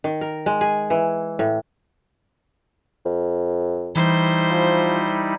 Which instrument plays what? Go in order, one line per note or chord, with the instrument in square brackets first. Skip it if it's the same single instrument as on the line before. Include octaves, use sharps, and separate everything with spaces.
[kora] D#3
A#4
G#3
G#4
E3
A2
[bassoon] F2
[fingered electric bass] E3 [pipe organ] G3 D#4 E4 [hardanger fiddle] C5
[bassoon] F3